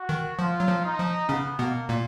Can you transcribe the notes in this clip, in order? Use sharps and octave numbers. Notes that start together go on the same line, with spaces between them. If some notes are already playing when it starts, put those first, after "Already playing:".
Already playing: F#4
D#3
F3 F4
F#3
F3
D#4
F3
C#3 B3 C#4
B2 A#3 B3
A#2 A#3